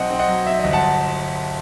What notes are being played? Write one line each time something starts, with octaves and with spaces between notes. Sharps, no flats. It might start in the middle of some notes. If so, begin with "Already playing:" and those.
Already playing: B1 C4 D#5 F#5
C4
D#5 F#5
F#3
C4 E5
D#5
G1
F#5 A5